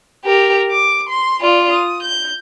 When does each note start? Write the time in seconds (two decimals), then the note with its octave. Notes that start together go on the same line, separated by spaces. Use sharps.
0.24 G4 A#4
0.71 D6
1.09 C6
1.41 F4 D5
1.72 D#6
2.03 G6